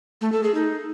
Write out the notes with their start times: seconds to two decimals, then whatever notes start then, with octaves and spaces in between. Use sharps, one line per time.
0.21 A3
0.32 A4
0.43 G#4
0.54 D#4